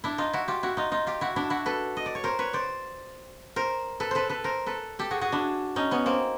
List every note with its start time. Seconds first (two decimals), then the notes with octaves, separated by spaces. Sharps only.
0.04 D4 E4
0.18 D#4 F4
0.33 E4 F#4
0.48 F4 G4
0.63 E4 F#4
0.77 D#4 F4
0.92 D#4 F4
1.07 F4 G4
1.21 E4 F#4
1.36 D4 E4
1.50 E4 F#4
1.66 A4 B4
1.97 D#5
2.06 D5
2.15 C#5
2.24 A#4 C5
2.39 B4 C#5
2.53 C5 D5
3.56 A#4 C5
4.00 A4 B4
4.11 A4 B4 C5
4.29 A4 B4
4.44 A#4 C5
4.66 A4 B4
4.99 G4 A4
5.11 F#4 G#4
5.21 F#4 G#4
5.32 D4 E4
5.76 C#4 D#4
5.91 B3 C#4
6.06 A#3 C4